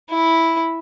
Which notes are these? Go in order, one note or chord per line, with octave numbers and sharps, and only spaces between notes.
E4